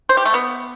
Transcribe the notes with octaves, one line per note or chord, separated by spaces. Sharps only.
C5
G4
A3
B3